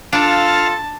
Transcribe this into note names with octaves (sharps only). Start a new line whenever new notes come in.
D4 F4 A4 F5 A5